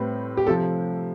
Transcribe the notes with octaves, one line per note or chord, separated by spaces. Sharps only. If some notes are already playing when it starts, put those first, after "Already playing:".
Already playing: A2 G3 C4 B4
G4
C3 F3 A4